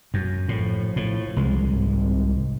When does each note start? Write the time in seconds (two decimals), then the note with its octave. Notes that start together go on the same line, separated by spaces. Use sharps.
0.14 F#2
0.48 A#1 A2 F3
0.96 A2
1.37 C2 G#3
1.72 G#1